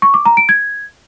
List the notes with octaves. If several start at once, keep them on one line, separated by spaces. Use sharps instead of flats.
C#6
D6
A#5
D7
G#6